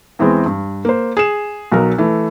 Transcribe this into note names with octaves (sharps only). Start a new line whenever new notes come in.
E2 E3 G#3 C4
G2
A#3 C5
G#4 E7
B1 F#3 A#4
E3 A3